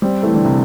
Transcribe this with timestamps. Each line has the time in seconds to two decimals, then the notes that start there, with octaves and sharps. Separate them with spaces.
0.02 G3 C4
0.23 E3 A3
0.34 D3 G3
0.45 C3